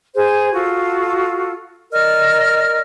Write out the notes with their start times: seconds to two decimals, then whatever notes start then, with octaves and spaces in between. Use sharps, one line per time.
0.15 G#4 C5
0.53 F4 F#4 A4
1.92 A#4 D5 D#5 F6